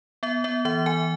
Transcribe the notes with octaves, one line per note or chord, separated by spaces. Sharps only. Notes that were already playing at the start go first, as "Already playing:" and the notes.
B3 E5
B3 E5
E3 E5
E3 G#5